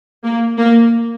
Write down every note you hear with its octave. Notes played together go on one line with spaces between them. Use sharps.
A#3
A#3